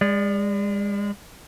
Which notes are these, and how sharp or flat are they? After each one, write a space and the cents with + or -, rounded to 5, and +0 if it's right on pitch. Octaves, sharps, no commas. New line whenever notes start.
G#3 -35 D5 +0